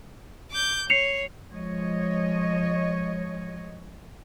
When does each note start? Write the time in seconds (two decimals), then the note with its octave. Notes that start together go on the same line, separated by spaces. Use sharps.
0.51 D6 G6
0.90 C#5 C7 C#7 F7
1.51 F3 G#3 C#5 D#5